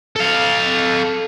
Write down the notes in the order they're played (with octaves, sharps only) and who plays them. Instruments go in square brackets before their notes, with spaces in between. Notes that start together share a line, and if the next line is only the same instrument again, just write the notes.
[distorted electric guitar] A4 F5